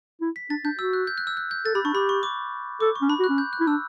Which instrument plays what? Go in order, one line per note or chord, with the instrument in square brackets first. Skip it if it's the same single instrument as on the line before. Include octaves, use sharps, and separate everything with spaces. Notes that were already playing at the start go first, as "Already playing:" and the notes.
[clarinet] E4
[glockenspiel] B6
[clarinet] D4 [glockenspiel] A6
[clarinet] D4 [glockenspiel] G6
[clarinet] F#4 [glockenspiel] E6
[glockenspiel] F#6
G6
F#6
E6
F#6
G6
[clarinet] A4 [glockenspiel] A6
[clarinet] G4 [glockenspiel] B5
[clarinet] D4 [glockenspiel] C#6
[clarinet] G4 [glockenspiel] B5
[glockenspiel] C#6
D6
[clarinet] A4 [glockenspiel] D6
[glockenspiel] C#6
[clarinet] C#4
[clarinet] D4 [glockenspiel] B5
[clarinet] F#4
[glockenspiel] F#6
[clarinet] C#4
[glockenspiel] G6
F#6
[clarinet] E4
[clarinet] D4 [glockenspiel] E6